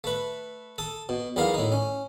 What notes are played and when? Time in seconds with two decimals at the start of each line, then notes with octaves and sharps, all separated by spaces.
0.04 A3 B4
0.78 A4 D#6
1.09 B2
1.36 B1 E2 B3 A#4 F5
1.54 A2 D#4
1.72 C#4